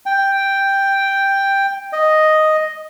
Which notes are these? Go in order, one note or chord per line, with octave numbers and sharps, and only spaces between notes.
G5
D#5